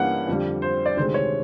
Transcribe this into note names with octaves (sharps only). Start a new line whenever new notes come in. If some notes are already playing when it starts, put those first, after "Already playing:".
Already playing: G2 E3 G3 A#3 C#4 F#5
F2 D3 G3
C5
D5
D2 C3 D#3 G#3 C4 C5
C#5